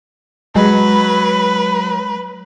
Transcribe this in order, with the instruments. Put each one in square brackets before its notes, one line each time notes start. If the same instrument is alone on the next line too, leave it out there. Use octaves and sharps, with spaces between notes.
[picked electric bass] F#3 [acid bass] G#3 [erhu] B4